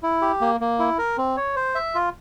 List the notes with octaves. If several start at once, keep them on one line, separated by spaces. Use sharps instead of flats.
E4
G4
A#3
A#3
E4
A#4
C4
C#5
C5
E5
F4